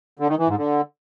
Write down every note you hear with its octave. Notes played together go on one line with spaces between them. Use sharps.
D3
D#3
E3
G#2
D3